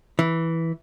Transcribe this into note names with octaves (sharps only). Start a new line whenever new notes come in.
E3